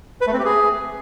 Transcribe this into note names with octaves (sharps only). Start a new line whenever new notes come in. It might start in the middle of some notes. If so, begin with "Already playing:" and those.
B4
A3
C4
G4
G#4